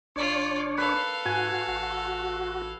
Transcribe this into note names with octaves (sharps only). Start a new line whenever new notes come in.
F#1 D4 F4 C#5 D5
A4 B4 F5
G#2 F#4 G#5
A1